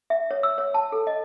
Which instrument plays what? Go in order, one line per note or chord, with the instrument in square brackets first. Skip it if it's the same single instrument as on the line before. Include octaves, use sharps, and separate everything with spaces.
[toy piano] E5
C#5
E6
C#5
A5
A4
D#5